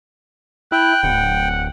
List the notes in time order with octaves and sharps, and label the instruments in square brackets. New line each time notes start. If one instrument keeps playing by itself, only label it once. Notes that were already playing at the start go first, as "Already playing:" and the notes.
[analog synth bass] E4 [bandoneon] G5 [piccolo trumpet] F#6
[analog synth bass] D1 [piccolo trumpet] F#5